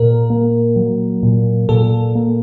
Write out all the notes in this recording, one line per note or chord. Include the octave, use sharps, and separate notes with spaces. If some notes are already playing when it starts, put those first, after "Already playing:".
Already playing: A#2 A#4
A#3
F#3
A#2
A#2 A4
A#3